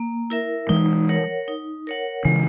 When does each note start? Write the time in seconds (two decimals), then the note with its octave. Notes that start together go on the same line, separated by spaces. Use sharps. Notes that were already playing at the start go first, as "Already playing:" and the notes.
Already playing: A#3
0.30 E4 A#4 E5
0.69 E3 G#3 D#4
1.09 A#4 C#5 F#5
1.48 D#4
1.87 A#4 C#5 F#5
2.25 C#3 E3 G#3